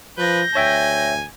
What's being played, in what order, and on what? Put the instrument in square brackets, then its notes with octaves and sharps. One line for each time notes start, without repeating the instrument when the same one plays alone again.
[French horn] F3 [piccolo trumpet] B4 [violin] G6 A#6
[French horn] D2 [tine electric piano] C#5 E5 G5 [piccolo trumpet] G#5